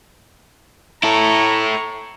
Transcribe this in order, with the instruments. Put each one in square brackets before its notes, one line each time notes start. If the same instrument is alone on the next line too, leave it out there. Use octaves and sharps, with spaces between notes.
[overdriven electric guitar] E4 A4 [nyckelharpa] A#5 C#6